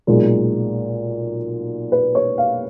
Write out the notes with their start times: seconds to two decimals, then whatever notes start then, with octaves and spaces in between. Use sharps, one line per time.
0.07 B1 A#2 G#3 A#4
1.92 B4
2.15 C#5
2.38 F5